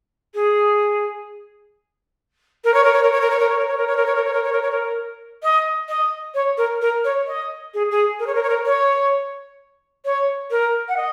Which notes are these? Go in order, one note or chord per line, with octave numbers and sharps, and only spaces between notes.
G#4
A#4
C#5
A#4
C#5
A#4
C#5
A#4
C#5
A#4
C#5
A#4
C#5
A#4
C#5
A#4
C#5
A#4
C#5
A#4
C#5
A#4
C#5
A#4
D#5
D#5
C#5
A#4
A#4
C#5
D#5
G#4
G#4
A#4
C#5
A#4
C#5
A#4
C#5
C#5
A#4
F#5
D#5